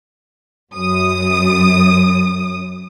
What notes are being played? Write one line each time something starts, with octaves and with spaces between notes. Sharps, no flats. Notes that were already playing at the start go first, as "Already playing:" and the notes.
F#2 D#6